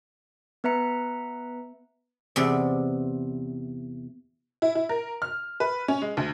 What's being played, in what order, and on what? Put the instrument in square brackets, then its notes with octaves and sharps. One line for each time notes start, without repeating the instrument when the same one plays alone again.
[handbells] B3 B4 E5 A#5 C#7
[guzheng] E2 C3 D5
[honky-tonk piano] E4
E4
A#4
F6
B4
C#4
G#3
D2